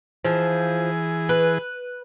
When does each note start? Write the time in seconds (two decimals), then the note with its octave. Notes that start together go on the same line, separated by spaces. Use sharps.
0.25 E3 F3 G#4
1.29 B4